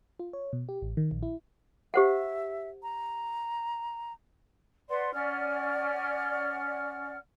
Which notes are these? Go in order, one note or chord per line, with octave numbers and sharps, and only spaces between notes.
F4
C#5
B2
G4
A1
D#3
A#1
E4
G4 C5 E5 F#5
A#5
B4 D5 F#5 C6
C#4 D5 F#5 F6